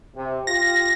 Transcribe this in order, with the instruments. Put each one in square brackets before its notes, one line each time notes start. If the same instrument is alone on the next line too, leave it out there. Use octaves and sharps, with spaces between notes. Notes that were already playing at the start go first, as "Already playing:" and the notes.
[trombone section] C3
[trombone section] F4 G4 [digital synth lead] A#6